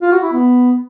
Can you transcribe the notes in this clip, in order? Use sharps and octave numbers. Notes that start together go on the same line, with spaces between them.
F4
F#4
E4
B3